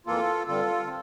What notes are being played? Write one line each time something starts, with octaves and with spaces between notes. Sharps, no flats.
F2 E3 A#3 F4 A4
G2 D3 G3 C4 F4 A4
C4